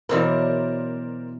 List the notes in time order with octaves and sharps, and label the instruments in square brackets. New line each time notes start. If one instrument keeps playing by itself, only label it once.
[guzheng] B2 E3 F#3 [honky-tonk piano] A#4 C5 D5